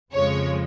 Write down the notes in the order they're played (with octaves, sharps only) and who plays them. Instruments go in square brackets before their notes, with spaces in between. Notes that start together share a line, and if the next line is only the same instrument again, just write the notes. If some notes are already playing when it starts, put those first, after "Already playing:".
[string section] F2 C#3 F3 G#3 C#5